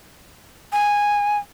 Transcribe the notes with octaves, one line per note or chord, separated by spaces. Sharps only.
G#5